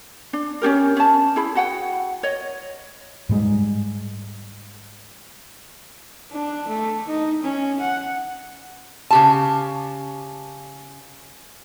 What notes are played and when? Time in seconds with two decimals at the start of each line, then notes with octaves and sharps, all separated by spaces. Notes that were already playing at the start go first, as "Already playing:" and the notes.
0.33 D4
0.62 C#4 D4 G4 A#4
0.97 C#4 A5
1.36 E4 G#4 B5
1.55 F#4 F#5 G5
2.23 C#5 D#5
3.29 G#2 G3 G#3
6.31 D4
6.68 A3
7.08 D#4
7.43 C#4
7.80 F#5
9.11 C#3 G4 A5